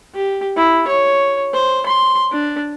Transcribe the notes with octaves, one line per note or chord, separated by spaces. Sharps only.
G4
E4
C#5
C5
C6
D4